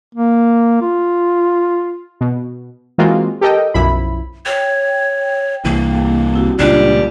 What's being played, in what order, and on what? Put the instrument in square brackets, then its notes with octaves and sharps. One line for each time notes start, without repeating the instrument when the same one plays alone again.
[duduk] A#3
F4
[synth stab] B2
E3 G#3 A#3 C4 F4 F#4
G4 A4 A#4 D#5 G5
B1 F#2 F3 E4 B5
[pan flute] C#5 [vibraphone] G5
[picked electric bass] C2 E3 [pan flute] A#3
[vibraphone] C4 E4 F#4
[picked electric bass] C#2 A#2 [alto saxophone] G3 [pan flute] D4 [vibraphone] F4